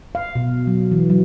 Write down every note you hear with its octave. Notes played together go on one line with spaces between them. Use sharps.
F5
B2
F#3
E3
F#3